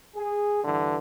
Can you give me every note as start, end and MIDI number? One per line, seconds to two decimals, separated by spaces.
0.16 0.64 68
0.64 0.98 43
0.64 0.98 50
0.64 0.98 52